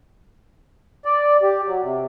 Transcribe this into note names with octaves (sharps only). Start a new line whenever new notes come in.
D5
G4
F#3
C3